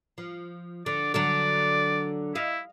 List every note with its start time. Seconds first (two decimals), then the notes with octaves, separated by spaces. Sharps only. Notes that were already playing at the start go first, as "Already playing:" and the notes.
0.18 F3
0.86 D3 D5
1.14 D3 F#3 A4 D5
2.35 E4 D#5 F5